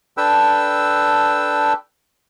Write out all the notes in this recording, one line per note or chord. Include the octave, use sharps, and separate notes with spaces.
D4 A4 B4 G5 E6